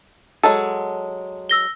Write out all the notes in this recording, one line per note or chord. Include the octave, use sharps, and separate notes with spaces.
F#3 G#3 A4 A5
E6 A#6 G7